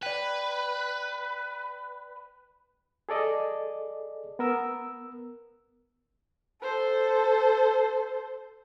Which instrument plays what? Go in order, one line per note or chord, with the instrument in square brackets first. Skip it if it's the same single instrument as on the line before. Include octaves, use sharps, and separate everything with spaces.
[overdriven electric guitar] B4 [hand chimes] D5 G5
[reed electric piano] G#4 A4 D5 D#5
B3 A#4 E6
[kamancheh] A4 C5